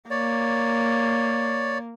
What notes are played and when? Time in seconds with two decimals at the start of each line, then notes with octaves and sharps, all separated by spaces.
0.10 A#3 C#5 D5